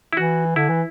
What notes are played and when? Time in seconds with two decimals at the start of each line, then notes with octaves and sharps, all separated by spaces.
0.13 E4
0.17 E3 F#4
0.56 D3 E4
0.69 E3